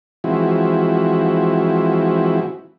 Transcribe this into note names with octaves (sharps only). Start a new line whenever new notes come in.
E3 F3 G#3 C4 E4 F#4